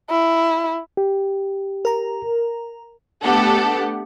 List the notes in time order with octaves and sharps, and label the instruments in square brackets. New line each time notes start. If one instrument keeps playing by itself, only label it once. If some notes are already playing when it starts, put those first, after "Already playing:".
[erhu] E4
[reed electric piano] G4
[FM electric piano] A#4 A#5
[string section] A3 B3 D4 G4 A4 F#5